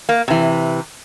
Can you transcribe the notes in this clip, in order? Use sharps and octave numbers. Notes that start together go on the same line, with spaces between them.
A#3
C3 E3